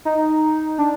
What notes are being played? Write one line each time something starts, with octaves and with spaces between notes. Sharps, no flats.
D#4
D4